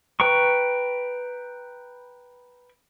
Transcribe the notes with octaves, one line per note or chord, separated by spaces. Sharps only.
B4 G5 A#5 C#6